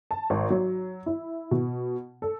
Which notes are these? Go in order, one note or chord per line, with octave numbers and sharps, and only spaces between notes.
A5
G#1
F#3
E4
B2
A4